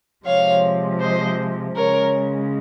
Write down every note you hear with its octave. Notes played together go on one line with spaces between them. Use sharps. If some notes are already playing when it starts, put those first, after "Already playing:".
C3 F3 G#3 C#5 F5
C5 D#5
C#3 G#3 A#4 C#5